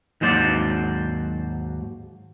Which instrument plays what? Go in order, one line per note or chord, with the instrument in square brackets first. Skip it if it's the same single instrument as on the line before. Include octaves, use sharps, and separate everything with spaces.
[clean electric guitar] D#2 G#2 F#3 C5 D5